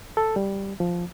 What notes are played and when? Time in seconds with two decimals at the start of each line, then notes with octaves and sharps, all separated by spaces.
0.17 A4
0.36 G3
0.80 F3